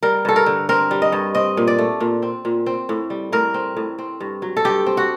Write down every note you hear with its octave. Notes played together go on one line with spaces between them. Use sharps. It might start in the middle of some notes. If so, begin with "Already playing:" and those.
G3 A#4
G2 A4
A#4
D3
C4 A#4
G3
D#5
G2
C4 D#5
A#2
D5
A3
A#2
C4
A#2
C4
A2
G3
A2 A#4
C4
A2
C4
G2
F#3
A4
G2 G4
C4
F#4